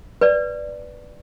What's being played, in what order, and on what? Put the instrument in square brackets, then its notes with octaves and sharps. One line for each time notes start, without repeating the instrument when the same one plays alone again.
[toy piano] B4 D5